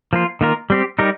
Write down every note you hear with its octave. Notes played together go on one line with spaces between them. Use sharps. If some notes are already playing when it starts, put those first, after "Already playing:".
F3 A#3 F4
D#3 A#3 F4 A#4
G3 C4 G4
G3 D#4 G4 A#4